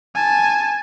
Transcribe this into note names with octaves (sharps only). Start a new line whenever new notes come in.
G#5 A5